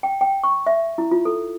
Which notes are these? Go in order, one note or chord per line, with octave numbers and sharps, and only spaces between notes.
G5
G5
C#6
E5
E4
F4
A4